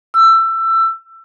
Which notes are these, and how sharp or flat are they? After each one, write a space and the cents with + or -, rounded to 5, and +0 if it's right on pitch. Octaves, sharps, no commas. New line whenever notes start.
E6 +20